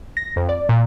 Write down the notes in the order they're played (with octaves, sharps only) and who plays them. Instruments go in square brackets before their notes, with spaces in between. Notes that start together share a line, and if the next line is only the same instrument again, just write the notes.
[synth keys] A#6
F2
D5
A#2